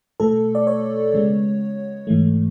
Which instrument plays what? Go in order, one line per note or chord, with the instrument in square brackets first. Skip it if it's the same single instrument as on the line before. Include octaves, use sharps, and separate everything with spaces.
[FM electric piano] B2 A3 A4
D5
C#5
C#3 G#3 B3
G#2 E3 A3